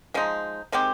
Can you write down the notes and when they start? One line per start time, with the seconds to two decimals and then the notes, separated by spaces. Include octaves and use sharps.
0.14 F3 G#3 D#4
0.72 D#3 G#3 C4 G4